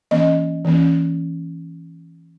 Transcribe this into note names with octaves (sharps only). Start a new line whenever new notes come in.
E3 A#3 C#4 D#5
E3 A#3 C#4